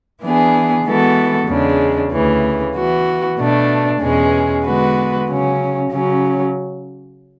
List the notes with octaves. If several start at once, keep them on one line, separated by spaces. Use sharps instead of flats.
E3 B3 D4 G#4
E3 G#3 B3 F#4 A4
E2 C#3 G#3 D4
D2 C#3 E3
E3 B3 F#4
B2 A3 D4
E2 B2 G#3 C#4 G#4
D3 G#3 B3 F#4 B4
C#3 F#3 C#4
C#3 F#3 C#4